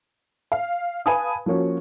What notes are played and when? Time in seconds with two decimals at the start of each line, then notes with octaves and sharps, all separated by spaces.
0.52 F5
1.06 B4 F5 G#5 A5 B5 D#6
1.46 F3 A#3 C#4 F#4